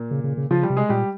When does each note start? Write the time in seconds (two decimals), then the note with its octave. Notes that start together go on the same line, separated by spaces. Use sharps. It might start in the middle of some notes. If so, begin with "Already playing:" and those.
Already playing: A#2 A#3
0.11 C#3
0.24 C#3
0.37 C#3
0.51 C#3 F3 F4
0.63 G3 G4
0.70 C3
0.77 G#3 G#4
0.89 A#2 G3 G4